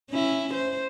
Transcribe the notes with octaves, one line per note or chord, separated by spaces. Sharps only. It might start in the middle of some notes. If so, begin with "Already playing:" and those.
C#4 E4
C5